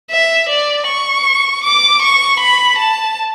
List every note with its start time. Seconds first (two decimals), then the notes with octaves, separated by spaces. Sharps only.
0.11 E5
0.49 D5
0.87 C#6
1.64 D6
2.02 C#6
2.40 B5
2.78 A5